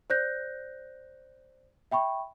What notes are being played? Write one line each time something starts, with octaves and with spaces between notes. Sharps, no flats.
C5 D5 F#6 G6 A#6
E5 G5 B5 C#6